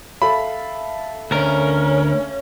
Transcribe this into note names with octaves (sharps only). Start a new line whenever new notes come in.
A4 E5 F5 B5
D2 C#4 A#4